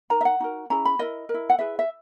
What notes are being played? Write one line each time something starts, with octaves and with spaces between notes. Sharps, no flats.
D#4 A#4 A#5
E5
F#5
D#4 F#4 A#4
C#4 E4 G#4 A#5
B5
E4 A#4 D#5
A#4
E4
F#5
E4 G#4 B4 E5
E5